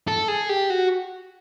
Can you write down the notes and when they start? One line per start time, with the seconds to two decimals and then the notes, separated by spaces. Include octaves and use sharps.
0.07 A4
0.28 G#4
0.49 G4
0.70 F#4